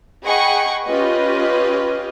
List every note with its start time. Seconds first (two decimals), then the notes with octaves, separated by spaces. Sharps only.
0.24 G#4 D#5 F#5 G5 B5 C#6
0.86 C#4 F4 G4 B4 D#5